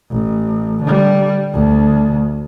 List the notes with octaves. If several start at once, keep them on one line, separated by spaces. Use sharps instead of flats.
A1
D3 G3
D2